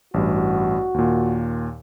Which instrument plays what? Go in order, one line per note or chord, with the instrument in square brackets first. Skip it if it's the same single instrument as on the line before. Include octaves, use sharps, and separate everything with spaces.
[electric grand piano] A1 G2 [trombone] F#4
[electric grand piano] D#2 A#2